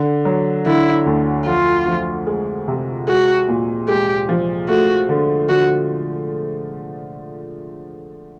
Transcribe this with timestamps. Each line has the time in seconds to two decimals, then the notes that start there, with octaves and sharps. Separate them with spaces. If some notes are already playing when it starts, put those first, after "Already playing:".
Already playing: D3
0.25 F#3
0.66 D3 E4
1.06 D2
1.46 F2 F4
1.87 F3
2.27 G#3
2.68 C3
3.07 G#3 F#4
3.49 A#2
3.88 G#3 G4
4.29 F3
4.68 A3 F#4
5.09 D3
5.49 D3 F#4